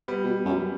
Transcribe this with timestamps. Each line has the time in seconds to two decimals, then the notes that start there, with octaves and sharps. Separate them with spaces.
0.08 G3 B3
0.24 B2
0.46 F#2